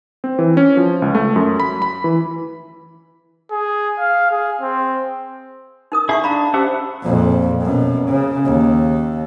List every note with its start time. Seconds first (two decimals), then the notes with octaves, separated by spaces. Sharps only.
0.24 C4
0.39 E3
0.57 C#4
0.77 F3
1.02 C#2
1.15 A3
1.36 F#2
1.60 B5
1.82 B5
2.04 E3
3.51 G#4
3.99 F5
4.31 G#4
4.61 C4
5.92 D#4 A#4 D#6
6.09 E4 G#4 D5 E5 C#6
6.24 D4 F5 A#5 B5
6.54 C#4 D4 G4 C5 E5 F#5
7.03 A#1 F2
7.61 F#2 B2
8.09 C#3
8.45 D#2